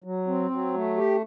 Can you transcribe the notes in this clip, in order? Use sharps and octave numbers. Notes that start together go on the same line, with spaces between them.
F#3
C4
F#3
A3
G4